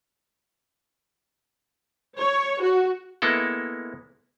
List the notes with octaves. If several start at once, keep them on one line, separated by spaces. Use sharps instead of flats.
C#5
F#4
G#3 A#3 B3 E4 A4